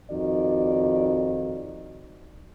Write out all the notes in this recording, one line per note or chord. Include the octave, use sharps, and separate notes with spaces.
F2 D#3 F#4 D5